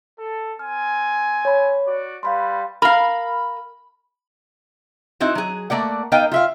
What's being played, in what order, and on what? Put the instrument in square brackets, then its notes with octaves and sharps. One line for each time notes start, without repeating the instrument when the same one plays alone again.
[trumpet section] A4
[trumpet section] C4 G#5 [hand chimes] F6
[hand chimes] C#5 B5
[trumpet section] F#4 D5
[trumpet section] G3 B4 [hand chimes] F5 B5 C6
[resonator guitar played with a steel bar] A#4 F5 [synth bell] B5
[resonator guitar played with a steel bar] C4 D#4 E4 F#4
F#3 G#4
A3 A#3 D5 F#5
B3 D#4 A#4 D#5 F5 G5
F4 E5 F5